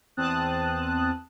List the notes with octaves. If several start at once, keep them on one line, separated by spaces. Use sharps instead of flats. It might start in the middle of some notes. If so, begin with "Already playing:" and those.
E2 C4 A5 D#6 F#6